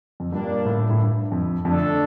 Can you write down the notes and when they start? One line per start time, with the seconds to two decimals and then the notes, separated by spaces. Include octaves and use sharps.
0.20 F2
0.32 G2 A#2 G3 A#3 D4
0.65 A2
0.90 A2
0.99 G2
1.32 F2
1.65 F2 D3 A3 D4 A4